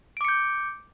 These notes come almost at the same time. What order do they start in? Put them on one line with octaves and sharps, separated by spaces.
D7 D6 C#7 G6